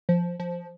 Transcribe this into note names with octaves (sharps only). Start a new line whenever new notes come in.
F3
F3